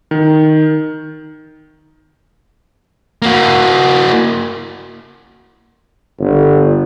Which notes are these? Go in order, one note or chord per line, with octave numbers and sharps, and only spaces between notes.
D#3
A#3 F#4
G1